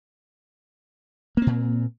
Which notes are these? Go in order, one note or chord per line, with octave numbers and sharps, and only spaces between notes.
A#2 A#3 C4